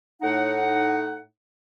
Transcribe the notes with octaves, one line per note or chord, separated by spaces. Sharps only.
A2 D#4 F#5